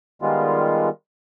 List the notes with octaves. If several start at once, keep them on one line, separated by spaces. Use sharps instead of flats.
D#3 G3 G#3 B3 F4